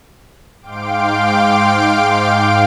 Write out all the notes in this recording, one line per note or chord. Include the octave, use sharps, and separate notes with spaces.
G#2 F5 G5 C6 D6 D7